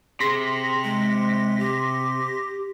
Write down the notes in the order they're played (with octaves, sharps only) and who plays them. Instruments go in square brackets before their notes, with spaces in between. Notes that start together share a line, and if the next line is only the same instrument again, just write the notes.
[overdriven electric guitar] C3 [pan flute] G#4 [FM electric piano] C6 A#6 B6
[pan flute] G#3
G4